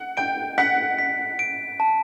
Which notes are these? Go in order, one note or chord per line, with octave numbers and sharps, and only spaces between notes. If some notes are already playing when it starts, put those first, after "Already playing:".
Already playing: F#5
G5 D7
F#5 B6
B6
D7
A5